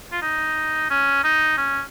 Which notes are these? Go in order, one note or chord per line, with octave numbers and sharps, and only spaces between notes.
F4
D#4
C#4
D#4
C#4